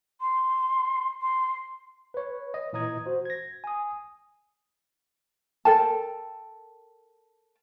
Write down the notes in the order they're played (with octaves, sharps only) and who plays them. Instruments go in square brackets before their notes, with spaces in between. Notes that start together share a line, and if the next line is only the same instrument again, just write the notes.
[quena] C6
C6
[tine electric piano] B4 C#5
D#5
A#2 E3 D#5 A#5 D#6 G#6
F#4 C5
G#6 A#6
G#5 D#6
[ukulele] A4 A#4 G5 A5